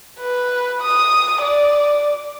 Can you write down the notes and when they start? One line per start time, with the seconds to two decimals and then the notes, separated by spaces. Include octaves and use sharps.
0.20 B4
0.81 D#6
1.42 D5